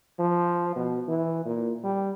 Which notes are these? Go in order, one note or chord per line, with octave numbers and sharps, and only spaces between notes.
F3
B2
E3
A#2
G3